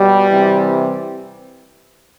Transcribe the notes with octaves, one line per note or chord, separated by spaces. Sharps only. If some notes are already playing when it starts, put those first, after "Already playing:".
Already playing: B2 G3
C3 E3